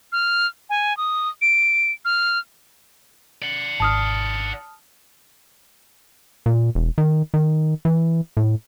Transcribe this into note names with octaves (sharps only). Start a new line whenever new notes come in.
F6
G#5
D#6
D7
F6
D5 F#5
G#1 A5 D#6 F6
A#2
E1
D#3
D#3
E3
A2